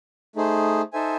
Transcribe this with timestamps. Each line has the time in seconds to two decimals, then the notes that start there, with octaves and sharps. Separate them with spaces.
0.36 A3 D#4 G#4 C5
0.93 D#4 A4 C5 E5 G#5